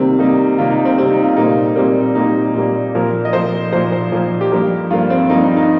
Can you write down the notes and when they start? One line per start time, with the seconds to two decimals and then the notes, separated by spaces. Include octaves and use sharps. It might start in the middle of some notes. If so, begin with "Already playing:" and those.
Already playing: C3 D#3 G3 A#3 C4
0.19 C3 D#3 G3 A#3 D#4
0.58 C3 D#3 G3 A#3 F4
0.71 D#4
0.85 C4
0.98 C3 D#3 G3 A#3 C4
1.11 D#4
1.24 F4
1.36 A#2 G3 A#3 D#4
1.76 A#2 G3 A#3 C4
2.15 A#2 G3 A#3 D#4
2.54 A#2 G3 A#3
2.95 A#2 F3 A#3 A#4
3.25 D#5
3.33 A#2 F3 A#3 C5
3.72 A#2 F3 A#3 C5
3.92 C5
4.12 A#2 F3 A#3
4.41 G4
4.52 G2 F3 A#3 A#4
4.90 G2 F3 A#3 F4
5.10 C4
5.29 G2 F3 A#3 D#4
5.44 D#4
5.57 D#4